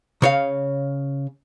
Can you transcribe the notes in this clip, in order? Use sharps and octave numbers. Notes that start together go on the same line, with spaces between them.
C#3 C#5 F5